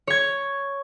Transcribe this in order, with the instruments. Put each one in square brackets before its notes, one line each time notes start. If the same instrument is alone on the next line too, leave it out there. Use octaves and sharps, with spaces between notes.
[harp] C#5 G#6